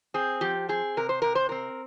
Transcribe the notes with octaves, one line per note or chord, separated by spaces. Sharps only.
C4 G#4
F3 G4
C4 G#4
C3 A#4
C5
C3 A#4
C5
C4 A#4